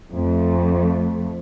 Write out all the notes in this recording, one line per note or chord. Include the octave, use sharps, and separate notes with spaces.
F2 A3